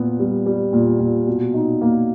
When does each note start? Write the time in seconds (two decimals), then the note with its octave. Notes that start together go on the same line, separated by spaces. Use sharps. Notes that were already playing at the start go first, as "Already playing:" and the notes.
Already playing: A#2 B3
0.20 G3
0.46 G3
0.73 A#2
1.00 A#2
1.27 B2
1.54 D#4
1.81 A#3